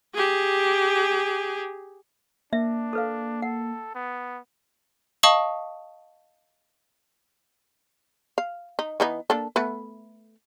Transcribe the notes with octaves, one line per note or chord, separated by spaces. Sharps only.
G4 G#4
A#3 D4 E5
A4 B4 F5
A4 F#5
B3
D#5 F5 A5 C#6 D#6 F#7
F5
D#4
E3 B3 D#4
A#3 D4 A4
A3 B3 B4